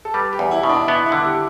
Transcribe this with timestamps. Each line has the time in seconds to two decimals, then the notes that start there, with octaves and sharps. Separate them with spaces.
0.05 A4
0.14 G3 B4
0.33 G4
0.39 E2
0.51 E4
0.63 B2
0.69 D4
0.88 B3 E4
1.06 E4
1.12 D3
1.25 G4